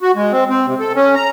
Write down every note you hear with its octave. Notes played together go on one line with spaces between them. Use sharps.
F#4
G#3
C4
C4
C3
A4
C#4
A#5